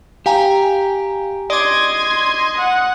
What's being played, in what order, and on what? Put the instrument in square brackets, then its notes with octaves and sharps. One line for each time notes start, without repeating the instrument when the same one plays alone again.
[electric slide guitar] G4 [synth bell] F5 G#5 A#5
[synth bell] D5 D6 [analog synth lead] D#5 [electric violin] C6 G#6
[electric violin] F#5